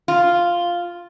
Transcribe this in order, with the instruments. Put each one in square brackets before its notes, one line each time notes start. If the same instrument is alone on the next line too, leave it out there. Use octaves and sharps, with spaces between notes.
[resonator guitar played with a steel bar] F4